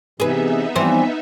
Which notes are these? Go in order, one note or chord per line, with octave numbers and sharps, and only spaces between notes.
C3 E3 B3 D#4 G#4 B4 E5
E3 F3 G3 C4 C5